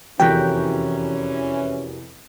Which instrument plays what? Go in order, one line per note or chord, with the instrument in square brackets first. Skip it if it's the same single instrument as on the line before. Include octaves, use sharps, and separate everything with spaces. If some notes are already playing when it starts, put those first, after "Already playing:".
[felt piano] F1 E2 [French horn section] E3 C#4 [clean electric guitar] F#4 G4 A#4 [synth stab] G5